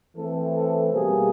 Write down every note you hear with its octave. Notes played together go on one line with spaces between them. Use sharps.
E3 A3 C4 A4
A4
B2 G3 A#3 G#4